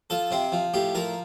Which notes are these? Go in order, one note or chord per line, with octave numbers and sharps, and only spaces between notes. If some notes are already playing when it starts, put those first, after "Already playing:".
F3 A4
C3 C4
F3
A2 G4
F3 A#4